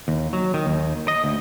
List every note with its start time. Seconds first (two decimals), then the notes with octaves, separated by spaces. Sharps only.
0.08 D#2
0.33 F#3
0.54 D#3
0.66 D#2
1.08 D#5
1.24 D2